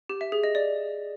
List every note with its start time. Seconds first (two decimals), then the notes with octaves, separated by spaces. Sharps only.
0.09 G4
0.21 E5
0.32 G#4
0.44 D#5
0.55 D5